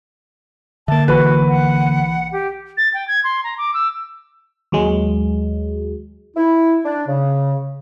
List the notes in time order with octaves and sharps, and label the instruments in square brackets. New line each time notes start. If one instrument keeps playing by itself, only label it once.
[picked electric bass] D3 A#3 [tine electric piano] E5 [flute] A5
[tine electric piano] B1 E3 B5 [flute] F#4 [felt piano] B4
[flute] F#5
G4
[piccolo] A6
G5
G#6
C6
A#5
D6
E6
[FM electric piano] D#2 F#3 G#3
[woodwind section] E4
D4
C#3